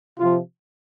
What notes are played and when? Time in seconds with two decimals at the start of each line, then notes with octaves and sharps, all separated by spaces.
0.18 C3 F3 F4